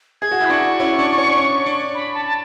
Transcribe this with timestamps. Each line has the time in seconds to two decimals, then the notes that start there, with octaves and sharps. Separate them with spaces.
0.22 G#4 G#6
0.31 F#4
0.41 E4
0.45 B5
0.50 D4 F#4 C#6
0.80 C#4 E4
0.99 D4
1.18 C#4
1.29 D4
1.37 C#4
1.66 D4
1.95 B5
2.14 A5
2.25 A5